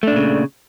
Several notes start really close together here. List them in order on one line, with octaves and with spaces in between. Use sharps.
A3 D4 A#2 C#3